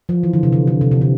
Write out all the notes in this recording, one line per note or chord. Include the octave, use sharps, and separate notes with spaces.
F3
E3
D3
C3
D3
D3
C3
C3
D3